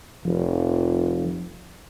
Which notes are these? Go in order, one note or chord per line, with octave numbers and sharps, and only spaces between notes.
F1 F3